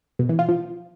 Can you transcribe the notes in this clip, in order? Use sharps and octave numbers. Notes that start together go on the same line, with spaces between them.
B2
E3
F4
F3